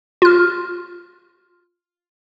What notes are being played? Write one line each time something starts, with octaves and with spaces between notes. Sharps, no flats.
F4 F6